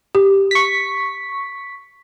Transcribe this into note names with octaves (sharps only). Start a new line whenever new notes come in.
G4
C#6 B6